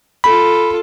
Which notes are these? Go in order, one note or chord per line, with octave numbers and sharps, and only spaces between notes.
F4 A4 B5